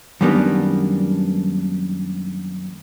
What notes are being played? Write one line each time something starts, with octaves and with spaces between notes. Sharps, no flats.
F#2 D#3 G3 A#3 B3 D4